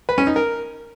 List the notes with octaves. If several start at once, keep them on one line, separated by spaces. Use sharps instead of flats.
B4
C#4
D#4
A#4